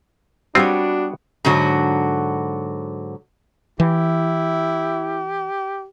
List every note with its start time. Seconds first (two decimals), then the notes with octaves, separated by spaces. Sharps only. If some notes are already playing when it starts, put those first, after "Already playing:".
0.55 G3 B3 C4 D4 F4 F#4 C#5
1.45 G#2 D3 F#3 F#4
3.80 E3 E4 G4